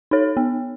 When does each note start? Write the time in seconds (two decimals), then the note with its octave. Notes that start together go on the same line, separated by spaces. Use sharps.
0.11 D#4 A4 C#5
0.37 B3